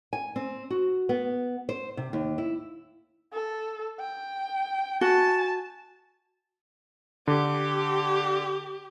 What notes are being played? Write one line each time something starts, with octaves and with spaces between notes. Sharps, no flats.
G#5
C4
F#4
B3
C5
C3
D#2
E4
A4
G5
F#4 G#5 A5
D3 G4